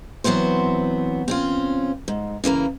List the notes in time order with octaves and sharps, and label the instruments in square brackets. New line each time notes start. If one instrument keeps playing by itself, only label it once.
[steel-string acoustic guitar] E3 F#3 B3 C4 C5
C4 C#4 F4
G#2
C#3 E3 A#3 A#4